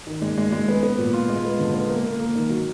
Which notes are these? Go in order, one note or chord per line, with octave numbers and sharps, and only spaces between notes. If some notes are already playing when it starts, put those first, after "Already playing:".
D#3
G#3
G#3
G#3
B3
B3
A#2
F4
G#3
B3
D3
B3
A#3
A#3
A#3
D#3
F#3